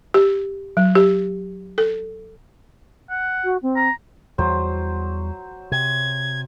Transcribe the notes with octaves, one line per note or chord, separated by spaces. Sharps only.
G4
F#3
G4
A4
F#5
F#4
C4
A#5
E2 F#3 G3 C5
C3 G#6